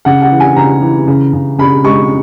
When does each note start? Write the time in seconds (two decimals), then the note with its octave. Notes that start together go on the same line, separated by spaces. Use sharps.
0.05 C#3 F#5
0.22 F#5
0.31 E3
0.40 G#5
0.56 C#3 A#5
0.82 E3
1.07 C#3
1.33 C#3
1.58 C#3 B5
1.85 G#3 C#6